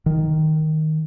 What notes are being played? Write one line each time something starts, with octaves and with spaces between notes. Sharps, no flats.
D#3